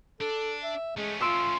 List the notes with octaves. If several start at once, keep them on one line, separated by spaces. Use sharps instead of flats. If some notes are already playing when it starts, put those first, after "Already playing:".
D4 A4
E5
G#3 A3 C#4
F4 C6 E6 D7